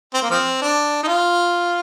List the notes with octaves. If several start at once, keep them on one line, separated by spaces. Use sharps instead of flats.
C4
A#3
F3 C4
D4
D#4
F4